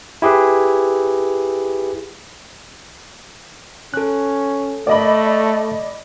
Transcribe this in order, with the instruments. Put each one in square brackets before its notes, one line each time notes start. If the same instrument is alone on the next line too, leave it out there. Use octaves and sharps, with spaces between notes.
[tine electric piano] E4 G4 G#4 B4
[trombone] C#4 [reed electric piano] A4 F#6
[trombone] A3 [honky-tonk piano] D5 D#5 B5